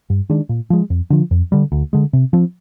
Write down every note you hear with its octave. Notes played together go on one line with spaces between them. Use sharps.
G2
D#3 G#3 D4
A#2
F3 G#3
F2
D3 F3
F2
D3 G3
D2
D3 G#3
C3
F3 C4